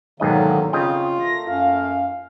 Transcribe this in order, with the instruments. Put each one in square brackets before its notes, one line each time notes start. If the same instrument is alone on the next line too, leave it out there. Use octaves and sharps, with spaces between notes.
[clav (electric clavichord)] B1 G#2 D#5 [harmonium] D3 F#3 A#3 [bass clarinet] D#3
[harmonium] F2 [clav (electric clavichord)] C#3 D#5 G5 [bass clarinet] F4
[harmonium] A3 A#3 [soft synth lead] A#6
[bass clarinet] F#2 [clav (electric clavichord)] F4 [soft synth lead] F5